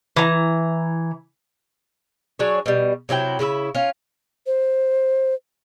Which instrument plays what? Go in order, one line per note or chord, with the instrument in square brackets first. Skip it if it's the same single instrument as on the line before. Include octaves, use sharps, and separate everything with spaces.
[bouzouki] E3 A#5
F#3 D4 G#4 C#5
B2 G3
C3 F#3 E4 G5
C#3 E4 A#4 E5
C#4 F4
[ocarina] C5